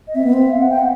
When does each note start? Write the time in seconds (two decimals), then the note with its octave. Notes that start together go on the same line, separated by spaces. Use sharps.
0.07 D#5
0.15 C4 E5
0.24 B3
0.33 C4
0.51 F5
0.61 F#5
0.69 G5
0.79 F#5